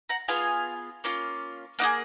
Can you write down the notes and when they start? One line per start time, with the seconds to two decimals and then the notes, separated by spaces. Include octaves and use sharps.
0.09 F#5 A#5
0.28 B3 F4 G#4 F5 G#5
1.04 A#3 C#4 F4
1.79 A#3 D#4 G#4 D#5 F#5